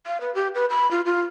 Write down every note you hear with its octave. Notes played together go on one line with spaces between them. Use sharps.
F5
B4
G4
B4
B5
F4
F4